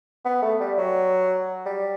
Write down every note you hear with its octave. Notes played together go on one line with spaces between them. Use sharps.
B3
A3
G3
F#3
G3